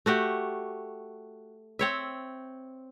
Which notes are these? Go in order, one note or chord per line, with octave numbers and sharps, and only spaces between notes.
A3 F#4 G4
C4 C#5 E5